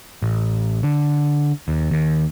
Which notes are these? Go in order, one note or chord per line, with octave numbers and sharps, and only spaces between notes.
A1
D3
D#2
D#2